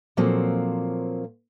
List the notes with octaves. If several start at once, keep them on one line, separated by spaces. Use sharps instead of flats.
A#2 F3 F#3 A#3 C4 A4